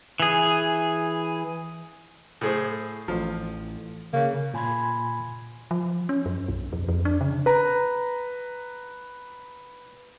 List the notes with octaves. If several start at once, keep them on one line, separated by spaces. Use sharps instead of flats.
E3 G#4
A2 G#4 C5
A1 F3
C#3 A#3
A#2 G#5 B5 C6 G#6
F3
C#4
F#2
B1
F2
F2
D4
C#3
B4 A#5